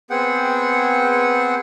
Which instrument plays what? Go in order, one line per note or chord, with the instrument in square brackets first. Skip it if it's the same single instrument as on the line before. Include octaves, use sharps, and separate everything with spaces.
[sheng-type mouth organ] B3 C4 G#4 F#5 G5